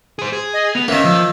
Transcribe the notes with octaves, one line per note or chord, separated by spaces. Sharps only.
G#4 C5
G#4
D#5
B3 F7
D#3 A#3 B3 C#4 E5
F3 E6